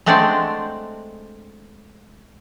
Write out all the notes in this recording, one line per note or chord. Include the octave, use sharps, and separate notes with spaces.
G#3 A3 C4 D4 D5 F#5